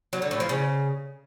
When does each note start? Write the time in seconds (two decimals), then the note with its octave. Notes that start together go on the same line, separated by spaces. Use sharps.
0.13 F#3
0.22 D3
0.31 A2
0.40 F3
0.49 C#3